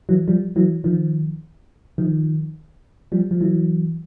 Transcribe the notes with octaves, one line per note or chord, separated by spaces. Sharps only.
E3 F#3
F3 G3
E3 F#3
D#3 F3
D#3 F3
F3 G3
F3
E3 F#3